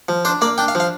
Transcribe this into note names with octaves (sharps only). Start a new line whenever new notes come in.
F3
D4 C5
A#3 D5
D4 G5
F5
F3
F5